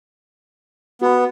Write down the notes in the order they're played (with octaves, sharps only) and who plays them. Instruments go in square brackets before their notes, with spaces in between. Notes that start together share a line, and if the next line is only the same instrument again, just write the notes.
[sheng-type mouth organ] B3 [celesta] F#4 B5